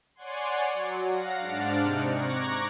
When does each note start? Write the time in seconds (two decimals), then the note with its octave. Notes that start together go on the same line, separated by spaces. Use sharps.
0.15 C#5 D5 F#5 G#5 C6
0.73 F#3
1.07 F5 F#5 A#6
1.38 G#2 D4 F6 F#6 A6 D7
1.80 C3 C4 D#4 C#7
2.12 A#5 C#6 D6 F#6 G#6 A#6